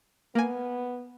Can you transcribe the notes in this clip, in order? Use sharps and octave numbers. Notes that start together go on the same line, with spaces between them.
A#3 B3 G#5